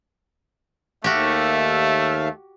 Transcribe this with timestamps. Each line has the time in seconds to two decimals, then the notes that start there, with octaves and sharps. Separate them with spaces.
1.04 D#2 A3 F#4 G4 E5 F5